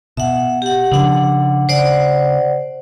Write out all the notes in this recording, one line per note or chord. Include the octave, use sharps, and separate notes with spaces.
B2 E5 F#5
G4 F#5
C#3 F3 D4 F#5
C#3 C5 D5 F#5